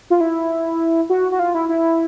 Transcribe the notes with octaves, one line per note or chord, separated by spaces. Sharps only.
F4
E4
F#4
F#4
F4
E4
E4